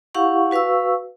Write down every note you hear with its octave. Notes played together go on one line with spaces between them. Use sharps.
E4 G4 F5 F#5 C#6
F#4 B4 F5 C#6 E6